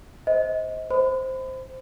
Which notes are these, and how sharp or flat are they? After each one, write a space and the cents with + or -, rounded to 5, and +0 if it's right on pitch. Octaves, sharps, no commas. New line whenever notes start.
C5 +0 D#5 +30
C5 +0 B5 +35